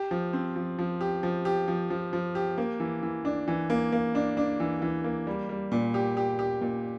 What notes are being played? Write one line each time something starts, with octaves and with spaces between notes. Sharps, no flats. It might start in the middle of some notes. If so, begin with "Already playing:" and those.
Already playing: G4
F3
C4
F3
F3
G4
F3
G4
F3
F3
F3
G4
A#3
E3
E3
D4
E3
A#3
A#3
D4
D4
E3
E3
A#3
G3
G3
A#2
G4
G4
G4
A#2